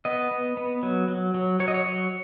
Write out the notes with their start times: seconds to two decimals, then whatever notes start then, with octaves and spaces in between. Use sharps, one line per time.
0.05 B3 D#5
0.31 B3
0.57 B3
0.83 F#3
1.08 F#3
1.34 F#3
1.60 F#3 C#5
1.68 D#5
1.74 C#5
1.86 F#3